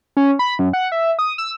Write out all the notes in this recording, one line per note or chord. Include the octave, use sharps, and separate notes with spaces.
C#4
B5
F#2
F#5
E5
D#6
E6